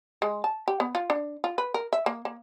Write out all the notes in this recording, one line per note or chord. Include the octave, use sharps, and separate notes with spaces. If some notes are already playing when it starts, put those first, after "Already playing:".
G#3
A5
G4
B3
F4
D4
F4
B4
A#4
E5
A#3
A#3